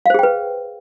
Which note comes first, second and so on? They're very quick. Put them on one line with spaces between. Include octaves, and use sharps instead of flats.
F5 C5 G#4 G5 B4